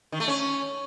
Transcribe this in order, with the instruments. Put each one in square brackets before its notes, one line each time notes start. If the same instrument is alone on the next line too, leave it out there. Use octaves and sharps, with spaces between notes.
[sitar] D#3
A3
C#4